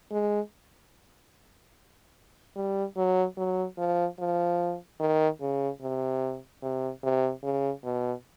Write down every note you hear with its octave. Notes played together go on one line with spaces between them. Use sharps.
G#3
G3
F#3
F#3
F3
F3
D#3
C#3
C3
C3
C3
C#3
B2